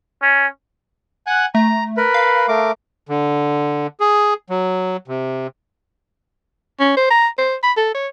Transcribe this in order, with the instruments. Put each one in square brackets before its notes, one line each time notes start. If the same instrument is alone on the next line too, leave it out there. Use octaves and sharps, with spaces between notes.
[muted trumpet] C#4
[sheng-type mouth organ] F#5 G#5 F#6
[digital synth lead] A3 [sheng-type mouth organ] A#5
[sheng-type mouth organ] A#4 B4 B5
[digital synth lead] F5
[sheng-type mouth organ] A3 A#4 D6
[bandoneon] D3
G#4
F#3
C3
[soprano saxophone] C#4
C5
A#5
C5
B5
A4
C#5